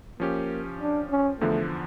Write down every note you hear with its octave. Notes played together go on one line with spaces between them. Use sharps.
F3 A#3 C#4 G4
D4
C#4
E2 D3 F3 A3